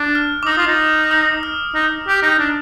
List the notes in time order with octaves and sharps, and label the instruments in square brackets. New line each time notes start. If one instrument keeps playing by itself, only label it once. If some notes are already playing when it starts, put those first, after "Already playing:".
Already playing: [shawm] D4
[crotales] F6
D6
[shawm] D#4 [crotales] D#6
[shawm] F4
D#4
[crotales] D#6
F6
[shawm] D#4
G4
D#4
D4